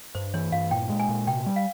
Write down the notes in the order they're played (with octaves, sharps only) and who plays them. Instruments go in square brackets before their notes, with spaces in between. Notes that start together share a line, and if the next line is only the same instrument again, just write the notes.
[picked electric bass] G2 [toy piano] C5
[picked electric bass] E3 [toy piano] C#5
[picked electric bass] G2 [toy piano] F5
[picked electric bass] A#2 [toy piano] G5
[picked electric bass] G#3
[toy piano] G#5
[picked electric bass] A#2
[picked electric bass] C3 [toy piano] G5
[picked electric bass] G3
[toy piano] F5